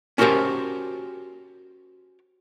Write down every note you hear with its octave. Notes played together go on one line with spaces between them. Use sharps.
C#4 F#4 G4 A#4 C5 A5